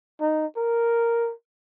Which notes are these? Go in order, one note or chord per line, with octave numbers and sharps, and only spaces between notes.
D#4
A#4